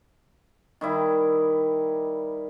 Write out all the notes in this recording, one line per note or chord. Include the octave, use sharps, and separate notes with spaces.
D#3 G3 E4